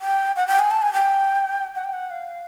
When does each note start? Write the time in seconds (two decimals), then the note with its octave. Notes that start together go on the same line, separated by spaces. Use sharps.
0.01 G5
0.36 F#5
0.48 G5
0.59 G#5
0.71 A5
0.82 G#5
0.94 G5
1.75 F#5
1.84 G5
1.93 F#5
2.11 F5